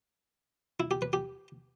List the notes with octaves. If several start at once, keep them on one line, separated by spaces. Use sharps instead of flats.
E4
G4
B4
G4